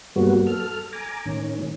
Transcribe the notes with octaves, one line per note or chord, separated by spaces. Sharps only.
G2 F#3 G3 A#3 B3 F#4
A4 F6
G#5 A#5 D6
A2 D#3 C#4